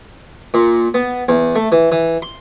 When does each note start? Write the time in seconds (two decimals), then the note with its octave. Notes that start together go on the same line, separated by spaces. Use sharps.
0.54 A#2
0.94 B3
1.28 E2
1.55 A3
1.72 E3
1.92 E3
2.22 C6